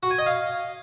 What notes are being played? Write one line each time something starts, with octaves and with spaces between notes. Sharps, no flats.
F#4
G#5
D#5
F5